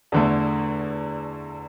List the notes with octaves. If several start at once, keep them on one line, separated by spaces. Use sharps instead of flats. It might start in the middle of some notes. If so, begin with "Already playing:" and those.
E2 D3 A3